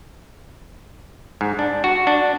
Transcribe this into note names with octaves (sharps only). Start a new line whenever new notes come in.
G#2
D4
F#4
D4